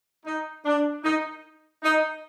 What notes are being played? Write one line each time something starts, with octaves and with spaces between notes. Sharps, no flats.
D#4
D4
D#4
D#4